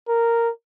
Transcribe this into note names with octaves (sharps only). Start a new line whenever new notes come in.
A#4